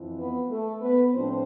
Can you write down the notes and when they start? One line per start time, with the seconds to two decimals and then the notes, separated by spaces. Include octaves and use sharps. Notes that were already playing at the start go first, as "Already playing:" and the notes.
Already playing: F2 E3
0.19 B3 B4
0.50 A3 A4
0.81 B3 B4
1.13 A2 F3 A3 C4 D4 C5